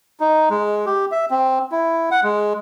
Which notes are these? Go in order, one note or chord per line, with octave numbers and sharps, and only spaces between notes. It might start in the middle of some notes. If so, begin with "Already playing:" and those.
D#4
G#3
G4
E5
C4
E4
F#5
G#3